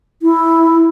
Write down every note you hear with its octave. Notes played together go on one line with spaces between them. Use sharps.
E4